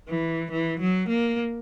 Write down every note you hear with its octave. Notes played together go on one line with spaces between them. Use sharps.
E3
E3
F#3
A#3